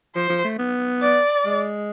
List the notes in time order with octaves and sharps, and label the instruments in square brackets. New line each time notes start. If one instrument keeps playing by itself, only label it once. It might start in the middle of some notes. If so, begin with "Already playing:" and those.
[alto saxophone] F3 [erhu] C5
[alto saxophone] F3
A3
B3
[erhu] D5
[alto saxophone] G#3